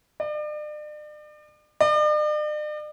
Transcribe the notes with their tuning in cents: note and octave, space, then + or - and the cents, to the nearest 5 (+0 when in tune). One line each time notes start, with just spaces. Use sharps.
D5 +40
D5 +45